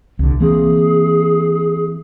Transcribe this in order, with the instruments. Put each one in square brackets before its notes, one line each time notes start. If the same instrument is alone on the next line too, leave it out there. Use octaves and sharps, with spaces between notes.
[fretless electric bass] C2 D3
[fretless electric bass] E3 A#3 C4 [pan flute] G#4